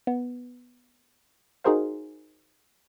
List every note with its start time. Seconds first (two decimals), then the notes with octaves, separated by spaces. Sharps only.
0.07 B3
1.64 D#4 F#4 G#4 A#4 C5 F5